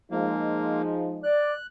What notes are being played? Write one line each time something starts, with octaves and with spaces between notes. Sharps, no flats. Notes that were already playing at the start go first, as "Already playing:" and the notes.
F3 G#3 A#3 D#4
D5 F#6